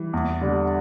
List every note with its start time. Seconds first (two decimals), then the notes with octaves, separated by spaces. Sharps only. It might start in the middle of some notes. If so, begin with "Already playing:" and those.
Already playing: E3 G3
0.13 E2
0.41 D3 G3 D4